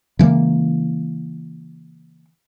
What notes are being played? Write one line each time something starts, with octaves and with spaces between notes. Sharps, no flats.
C#3 E3 G#3 A#3